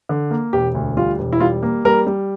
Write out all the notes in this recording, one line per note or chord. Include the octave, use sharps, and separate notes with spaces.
D3
A#3
E1 G4
D2
G3 F4
E1
E4
G3 F4
A#3
G3 A#4
G3